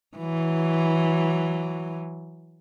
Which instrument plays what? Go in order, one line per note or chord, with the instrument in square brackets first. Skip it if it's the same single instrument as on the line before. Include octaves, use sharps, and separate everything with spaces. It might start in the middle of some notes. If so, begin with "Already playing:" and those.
[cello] E3 F#3